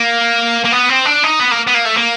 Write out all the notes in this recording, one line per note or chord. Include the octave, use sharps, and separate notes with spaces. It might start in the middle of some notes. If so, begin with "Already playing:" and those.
Already playing: A#3
A#3
B3
C4
D4
D#4
B3
A#3
B3
A#3
A3
A#3